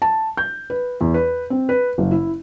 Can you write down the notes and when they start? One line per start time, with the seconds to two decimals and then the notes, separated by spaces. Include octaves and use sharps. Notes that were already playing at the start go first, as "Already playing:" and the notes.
0.02 A5
0.37 G6
0.70 B4
1.01 E2
1.14 B4
1.50 C4
1.69 B4
1.98 F#1
2.11 E4